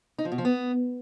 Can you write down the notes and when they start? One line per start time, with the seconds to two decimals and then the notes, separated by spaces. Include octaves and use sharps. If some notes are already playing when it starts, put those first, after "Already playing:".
0.18 D#4
0.25 F3
0.32 B2
0.38 F3
0.45 B3